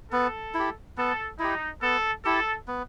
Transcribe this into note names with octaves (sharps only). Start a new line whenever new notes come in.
B3 A4
E4 G4
B3 A4
D#4 E4 G4
B3 A4
E4 G4 A4
B3